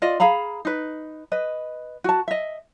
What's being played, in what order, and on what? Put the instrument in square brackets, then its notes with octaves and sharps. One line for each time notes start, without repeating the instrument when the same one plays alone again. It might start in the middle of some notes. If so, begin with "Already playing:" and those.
[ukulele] F4 D5 D#5
G#4 F5 A#5 B5
D#4 B4
B4 D#5
F#4 A5
D#5 E5